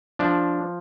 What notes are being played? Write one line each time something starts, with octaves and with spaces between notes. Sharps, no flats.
F3 D4